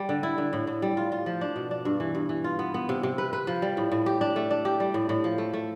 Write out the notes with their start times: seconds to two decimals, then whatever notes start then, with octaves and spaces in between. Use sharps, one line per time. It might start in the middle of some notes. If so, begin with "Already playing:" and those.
Already playing: G3
0.09 D3
0.23 E4
0.38 D3
0.53 A2
0.67 A2
0.82 G3
0.97 F4
1.12 F4
1.26 F3
1.41 D4
1.56 B2
1.71 D4
1.85 G2
2.00 E3
2.15 G2
2.29 E3
2.44 F4
2.59 B3
2.74 B3
2.89 C3
3.03 C3
3.18 B4
3.33 B4
3.47 F3
3.62 G3
3.77 A2
3.91 A2
4.06 G4
4.21 D4
4.36 A3
4.50 D4
4.65 G4
4.80 G3
4.94 A2
5.09 A2
5.24 F3
5.38 A3
5.53 A3